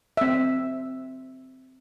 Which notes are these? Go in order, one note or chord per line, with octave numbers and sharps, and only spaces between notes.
C4 E5